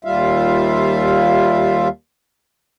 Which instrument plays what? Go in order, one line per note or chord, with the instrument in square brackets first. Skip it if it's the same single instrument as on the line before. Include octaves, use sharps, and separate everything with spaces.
[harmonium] D#2 G3 F4 E5 F5